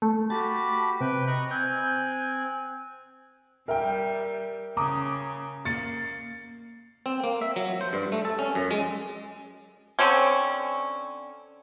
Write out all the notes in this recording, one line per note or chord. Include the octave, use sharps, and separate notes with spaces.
A3
F#4 G4 A5 B5
C3 B4 G5
D#5 A#5 C#6 F#6
C4 G#5 F#6 G6
G3 A#4 E5 G5
C#3 A#5 D6 D#6
A#3 A6 C#7
C4
A#3
E5
F#3
C5
G2
A3
A4
C#4
F#2
G#3
D3 C4 C#4